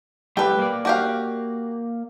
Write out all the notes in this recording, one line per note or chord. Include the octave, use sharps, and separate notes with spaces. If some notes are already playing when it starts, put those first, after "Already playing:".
G3 A3 G4 B4
A#3 D5
F#4 G4 F5